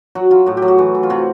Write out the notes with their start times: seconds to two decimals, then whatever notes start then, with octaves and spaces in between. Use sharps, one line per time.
0.15 F#3 F#4
0.31 F#3 F4
0.46 A2 F#4
0.57 G4
0.62 F#3
0.68 F#4
0.78 E3
0.95 E3
1.03 F4
1.10 C3 F#4